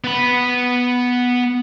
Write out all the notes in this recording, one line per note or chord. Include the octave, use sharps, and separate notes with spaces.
B3 B5